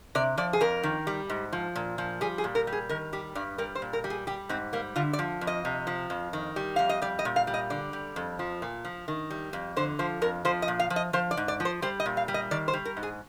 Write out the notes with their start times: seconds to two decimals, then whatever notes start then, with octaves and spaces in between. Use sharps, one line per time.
0.15 C3 D5
0.38 F3 D5
0.53 G#4
0.61 F2 A#4
0.83 D#3
1.07 G3
1.30 G#2
1.53 F3
1.76 A#2
1.98 F3
2.21 G3 G#4
2.38 G#4
2.44 A#2
2.55 A#4
2.67 G3
2.73 G#4
2.89 D#3 A#4
3.13 G3 G4
3.35 G2 D5
3.58 G3 A#4
3.75 C5
3.82 A#2
3.93 A#4
4.04 G3
4.10 G#4
4.27 G3 G4
4.49 G#2 C4
4.73 G3 A#3
4.96 D3 F4
5.13 D5
5.19 F3
5.41 F2
5.47 D#5
5.65 C3
5.87 F3
6.10 F2
6.33 D#3
6.56 G3
6.76 F2 F5
6.89 D#5
7.02 G3 D5
7.19 D#5
7.25 A#2
7.36 F5
7.47 G3
7.54 D#5
7.70 D3 D5
7.93 G3
8.16 F2
8.39 F3
8.62 A#2
8.85 F3
9.08 D#3
9.31 G3
9.53 F2
9.76 D3 C5
9.99 F3 C5
10.22 F2 A#4
10.45 F3 C5
10.62 D#5
10.68 A#2
10.79 F5
10.90 F3
10.96 D#5
11.13 F3 C5
11.31 D5
11.37 G#2
11.48 D5
11.60 F3
11.65 C5
11.82 G3 C5
12.00 D#5
12.06 A#2
12.17 F5
12.28 G3
12.34 D#5
12.51 D#3 D5
12.68 C5
12.73 G3
12.85 A#4
12.97 G#2
13.03 G#4